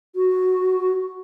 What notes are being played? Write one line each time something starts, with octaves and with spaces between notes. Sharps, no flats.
F#4